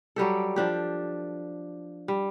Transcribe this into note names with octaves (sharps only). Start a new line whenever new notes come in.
F#3 G3 G4 A4
F3 D4 G4
G3